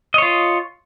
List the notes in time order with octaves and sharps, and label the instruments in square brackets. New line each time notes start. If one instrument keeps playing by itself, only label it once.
[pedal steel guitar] D#5
C#5
F4